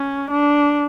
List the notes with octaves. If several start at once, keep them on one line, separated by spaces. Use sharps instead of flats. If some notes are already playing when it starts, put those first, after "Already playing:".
Already playing: C#4
D4